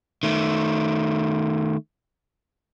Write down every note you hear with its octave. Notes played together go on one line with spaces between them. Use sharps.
D#3 A3